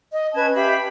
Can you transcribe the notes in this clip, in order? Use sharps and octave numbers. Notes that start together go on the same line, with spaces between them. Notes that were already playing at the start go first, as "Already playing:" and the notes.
D#5
C#4 B4 A5 G#6
G4 E5 F5 B5